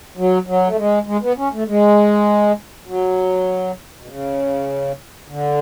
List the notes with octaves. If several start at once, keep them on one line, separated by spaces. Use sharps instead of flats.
F#3
F#3
A3
G#3
G#3
B3
C#4
A3
G#3
F#3
B2
C#3
D3